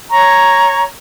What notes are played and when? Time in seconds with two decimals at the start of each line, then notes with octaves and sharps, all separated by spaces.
0.11 C#5 A#5 C#6